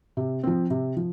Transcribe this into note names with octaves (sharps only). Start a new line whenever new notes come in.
C3
F3 C4
C3
F3